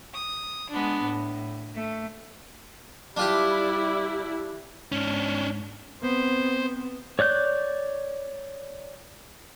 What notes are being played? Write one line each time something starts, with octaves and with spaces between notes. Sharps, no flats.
D#6
G#3 B3 D4
A2
A3
G3 D4 E4 F4 G4
G#2 C#4 D4
B3 C4 C5
C#5 D5 F#6 G6